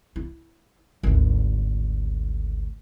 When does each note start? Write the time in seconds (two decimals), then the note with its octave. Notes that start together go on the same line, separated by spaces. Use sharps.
0.16 E4
1.03 G#1 D2